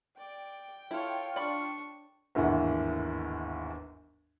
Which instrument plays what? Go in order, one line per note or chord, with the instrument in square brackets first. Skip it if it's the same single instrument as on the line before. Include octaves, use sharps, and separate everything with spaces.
[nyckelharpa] D5 [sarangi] G5
[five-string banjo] E4 [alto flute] F4 [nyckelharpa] A4 C#5
[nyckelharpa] D4 C#6 [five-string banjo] D5 B5
[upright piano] G1 D#2 G#2 E3 F#5